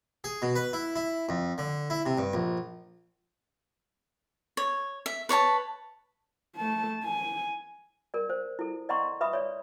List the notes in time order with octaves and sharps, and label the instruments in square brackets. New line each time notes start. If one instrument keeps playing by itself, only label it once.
[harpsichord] G#4
B2
B4
E4
E4
F2
D3
E4
C3
G2
A#1
[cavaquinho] C#5
E5
B4 C#5 G#5 A5
[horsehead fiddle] A3 A5
G#5
[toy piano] A#4 D5
C5
E4 A4
D5 D#5 F#5 A#5 C6 C#6
B4 E5 B5 D#6
C#5 D5